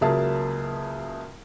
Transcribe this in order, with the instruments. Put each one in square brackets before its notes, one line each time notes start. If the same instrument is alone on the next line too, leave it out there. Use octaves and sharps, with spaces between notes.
[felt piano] C#2 F#3 A#3 G#4 E5 A5